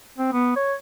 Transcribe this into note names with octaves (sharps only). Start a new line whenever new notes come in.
C4
B3
C#5